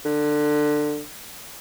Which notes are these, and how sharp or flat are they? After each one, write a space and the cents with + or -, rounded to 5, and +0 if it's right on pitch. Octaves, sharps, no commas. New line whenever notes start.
D3 +20